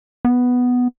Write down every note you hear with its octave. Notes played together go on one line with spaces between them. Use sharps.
B3